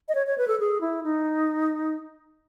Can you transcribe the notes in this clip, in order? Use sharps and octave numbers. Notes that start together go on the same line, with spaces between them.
D#5
C#5
C#5
B4
A4
G#4
E4
D#4